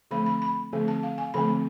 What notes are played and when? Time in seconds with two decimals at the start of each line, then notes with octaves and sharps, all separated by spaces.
0.11 D3 F3 A3 C4 B5
0.26 B5
0.42 B5
0.73 D3 F3 A3 C4
0.88 A5
1.03 F5
1.18 G#5
1.34 D3 F3 A3 C4 B5